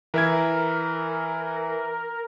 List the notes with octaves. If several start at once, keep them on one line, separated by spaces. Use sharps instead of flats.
E3 A#4 E5 G#6